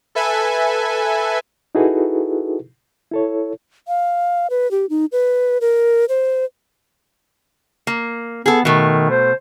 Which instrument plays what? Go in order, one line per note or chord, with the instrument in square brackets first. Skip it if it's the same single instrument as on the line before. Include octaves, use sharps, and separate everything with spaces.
[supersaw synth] A4 B4 E5 G#5
[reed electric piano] D#4 E4 F#4 G#4 A4 B4
E4 A4 C#5
[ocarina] F5
B4
G4
D#4
B4
A#4
C5
[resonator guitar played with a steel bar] A#3
[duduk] B3 [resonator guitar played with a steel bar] G#4 A4
[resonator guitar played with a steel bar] B2 A3 [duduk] D#3
[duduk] C5